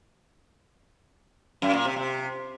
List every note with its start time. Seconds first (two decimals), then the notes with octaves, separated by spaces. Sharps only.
1.62 F#2
1.74 A#2
1.85 C3
1.96 C3